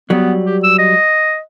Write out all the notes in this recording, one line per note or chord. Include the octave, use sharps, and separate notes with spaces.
F#3 G3 B3
G4
E6
D#5